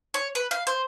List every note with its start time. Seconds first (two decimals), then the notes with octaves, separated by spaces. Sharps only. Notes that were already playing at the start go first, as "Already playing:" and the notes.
0.14 C#5
0.35 B4
0.51 F5
0.67 C5